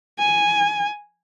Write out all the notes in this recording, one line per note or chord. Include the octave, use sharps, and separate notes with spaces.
G#5